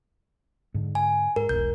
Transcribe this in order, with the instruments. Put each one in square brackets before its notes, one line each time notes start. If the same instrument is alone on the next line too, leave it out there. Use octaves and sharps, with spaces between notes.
[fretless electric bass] G#2 D3
[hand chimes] G#5
[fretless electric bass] G#2 [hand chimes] A#4
[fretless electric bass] E1 B1 [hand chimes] G6